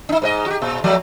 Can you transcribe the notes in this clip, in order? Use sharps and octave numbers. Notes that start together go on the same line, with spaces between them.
D4 D#4
G#2 B4 D#5
F#4 G4
A#2
F3 F#3 A3